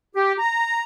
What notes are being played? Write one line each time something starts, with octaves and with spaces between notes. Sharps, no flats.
G4
A#5